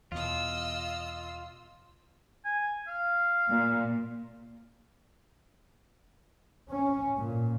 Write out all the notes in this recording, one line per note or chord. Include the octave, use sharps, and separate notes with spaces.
E2 B2 F4 D#5 E6
G#5
F5
A#2
C#4
A#2